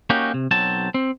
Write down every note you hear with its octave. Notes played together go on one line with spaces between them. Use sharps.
A#3 C#4 D#4 F#4 G4
C3
B1 F#3 C4 A5
C4